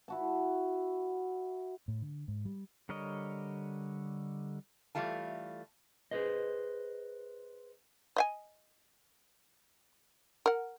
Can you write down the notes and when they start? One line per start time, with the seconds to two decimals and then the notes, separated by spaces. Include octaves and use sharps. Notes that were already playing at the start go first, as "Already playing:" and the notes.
0.08 E4 F#4 A5
1.88 A2
2.02 D3
2.28 G#2
2.45 G3
2.89 D3 G3 A#4 C#5 D#5
4.95 E3 G3 A3 F4 A5
6.11 G#4 B4 C5 D#5
8.16 D#5 E5 G#5
10.46 A#4 F#5